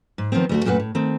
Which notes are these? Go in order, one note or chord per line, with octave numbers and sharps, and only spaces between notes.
G#2
D#3 F3 A3 B3 C4
D2 A3 F#4
F#2 A#2 A3 F#4 B4 F#5
A2
D#3 A3 C4